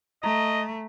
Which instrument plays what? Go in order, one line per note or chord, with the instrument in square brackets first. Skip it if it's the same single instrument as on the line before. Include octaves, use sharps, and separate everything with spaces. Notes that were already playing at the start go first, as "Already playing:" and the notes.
[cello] A3 [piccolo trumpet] D#5 [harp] A#5